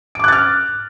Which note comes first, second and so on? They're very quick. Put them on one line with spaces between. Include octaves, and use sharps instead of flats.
D7 D6 F#6 A6 F6